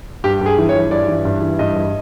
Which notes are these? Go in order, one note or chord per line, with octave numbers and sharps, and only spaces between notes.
G2 G4
G2 G#4
E3
C#5
E3
G2 D5
E3
G2
E3
G2 D#5
G2